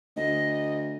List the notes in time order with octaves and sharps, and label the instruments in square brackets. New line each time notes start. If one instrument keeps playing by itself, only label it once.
[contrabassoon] D2 [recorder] D#5